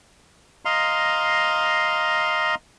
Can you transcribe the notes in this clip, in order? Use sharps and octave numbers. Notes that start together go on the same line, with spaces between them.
D#5 F5 A#5 C6